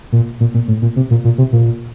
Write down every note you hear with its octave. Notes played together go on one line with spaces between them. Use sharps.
A#2
A#2
A#2
A2
A#2
C3
A#2
A#2
C3
A#2